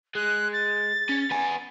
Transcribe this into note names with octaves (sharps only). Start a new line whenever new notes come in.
G#3 F#6
A6
C#4
B3 G#5